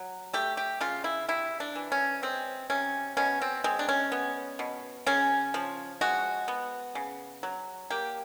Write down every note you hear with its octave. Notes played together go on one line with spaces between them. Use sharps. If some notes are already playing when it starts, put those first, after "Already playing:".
Already playing: F#3
A3 G4
G4
C#3 F4
E4
C3 E4
D4
E3
C#4
G#3 C4
C3 C#4
B2 C#4
C4
G#3 C4
D4
C#4
B3
B2
C#3 C#4
F3
G#3 F#4
B3
C#3
F#3
A#3 G4